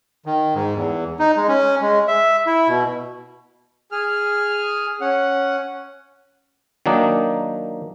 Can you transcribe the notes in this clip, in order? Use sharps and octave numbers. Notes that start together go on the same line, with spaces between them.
D#3
G#2
E2
D#4
G#3
C#4
G#3
E5
E4
B2
G#4 F6
C#4 F#5
D#3 F#3 A#3 D4 D#4